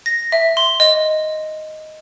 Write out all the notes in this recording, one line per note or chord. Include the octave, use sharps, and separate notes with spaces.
A#6
E5
C6
D#5